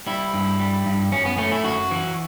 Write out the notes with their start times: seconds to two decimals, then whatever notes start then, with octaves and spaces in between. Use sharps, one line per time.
0.06 G3 E4
0.34 G2
0.60 G3
0.86 G2
1.12 F#2 C#4
1.25 B3
1.38 A3 C#4
1.52 E4
1.64 F#2 F#4
1.91 E3